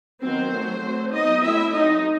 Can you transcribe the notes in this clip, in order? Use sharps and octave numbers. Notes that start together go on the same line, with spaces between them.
D#3 F#3 B3 C4 C5
F#3 A3 C4
F#3 A3 C4
F#3 B3 D#4 D#5
F#3 A3 C4 E4 E5
F#3 C4 D#4 D#5